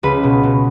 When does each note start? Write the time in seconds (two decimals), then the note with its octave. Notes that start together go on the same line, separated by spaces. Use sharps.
0.03 C#2 B4
0.24 B2
0.43 B2